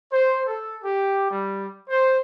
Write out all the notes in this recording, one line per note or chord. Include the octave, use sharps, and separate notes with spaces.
C5
A4
G4
G3
C5